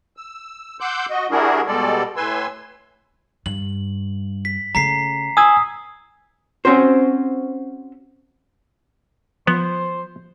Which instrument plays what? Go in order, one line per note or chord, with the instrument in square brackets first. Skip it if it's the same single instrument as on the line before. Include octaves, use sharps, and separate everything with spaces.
[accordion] E6
F#5 C6 D6 E6 F#6 G6
F#4 D#5
G3 D4 E4 F#4 G#4 A#4
B2 G3 G#3 A4 D5
A2 B4 G#5 C6 E6
[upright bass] G2 [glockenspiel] F#7
[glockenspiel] B6
[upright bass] C#3 A3 [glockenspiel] A#5 B6 C7
[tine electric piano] G#5 E6 G#6 [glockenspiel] D#6
[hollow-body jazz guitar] C4 C#4 F#4 C5
[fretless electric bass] F3 [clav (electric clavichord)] B3 [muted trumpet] C5